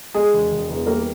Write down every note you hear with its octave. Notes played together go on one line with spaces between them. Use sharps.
G#3 G#4
E1
E1
E2
G3 A#3 A#4